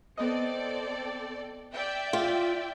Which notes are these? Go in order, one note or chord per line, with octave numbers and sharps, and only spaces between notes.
B3 C4 A4 D5 D#5
D5 E5 G5
F4